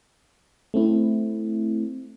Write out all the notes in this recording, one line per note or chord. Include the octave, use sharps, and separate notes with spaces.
A3 C4 E4